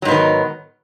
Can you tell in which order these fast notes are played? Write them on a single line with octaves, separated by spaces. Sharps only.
F#3 G#2 B3 D#3